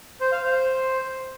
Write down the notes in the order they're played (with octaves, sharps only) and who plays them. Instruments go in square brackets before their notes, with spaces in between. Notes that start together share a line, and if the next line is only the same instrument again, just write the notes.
[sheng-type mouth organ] C5
F5
C5